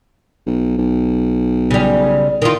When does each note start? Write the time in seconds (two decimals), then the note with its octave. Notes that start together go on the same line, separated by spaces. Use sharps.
0.46 B1
0.78 B1
1.71 C#3 G3
2.42 D#3 F4